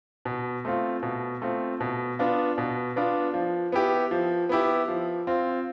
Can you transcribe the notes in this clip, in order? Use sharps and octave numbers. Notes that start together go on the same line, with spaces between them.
B2
A3 C4 F4
B2
A3 C4 F4
B2
B3 D4 F4
B2
B3 D4 F4
F3
B3 E4 G4
F3
B3 E4 G4
F3
C4 F4